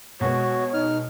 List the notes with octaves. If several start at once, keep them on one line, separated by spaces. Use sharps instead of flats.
B2 G#3 B3 F#4 C#5
D#4 F6